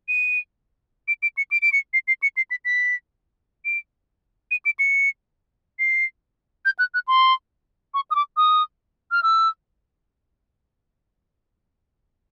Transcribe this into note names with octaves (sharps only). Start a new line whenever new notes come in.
D#7
D7
D7
C#7
D7
D7
C#7
C7
C7
C#7
C7
B6
B6
D7
D#7
D7
C#7
C7
G6
F#6
F#6
C6
C#6
D#6
D6
D#6
F6
E6